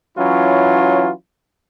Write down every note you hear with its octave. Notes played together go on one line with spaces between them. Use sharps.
E3 F#3 C#4 E4 F4